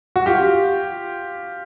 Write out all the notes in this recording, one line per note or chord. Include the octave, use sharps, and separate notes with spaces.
F#4
F4 G4